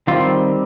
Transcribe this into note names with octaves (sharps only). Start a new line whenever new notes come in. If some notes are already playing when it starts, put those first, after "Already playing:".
D#3 G3 C4 F4